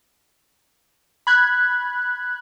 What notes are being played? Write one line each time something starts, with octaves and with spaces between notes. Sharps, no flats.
B5 F#6 G#6